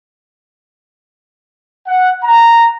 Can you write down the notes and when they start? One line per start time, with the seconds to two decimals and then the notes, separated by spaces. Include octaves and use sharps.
1.88 F#5
2.24 A#5